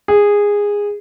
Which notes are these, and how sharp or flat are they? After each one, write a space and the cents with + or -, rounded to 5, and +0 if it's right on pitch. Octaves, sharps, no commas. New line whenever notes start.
G#4 -15